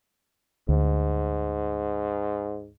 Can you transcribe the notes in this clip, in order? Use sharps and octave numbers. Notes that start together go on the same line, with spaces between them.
D2 G#2